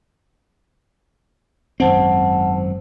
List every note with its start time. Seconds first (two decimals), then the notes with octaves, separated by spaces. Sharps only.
1.80 G#1 F#2 C4 C5 F#5 A5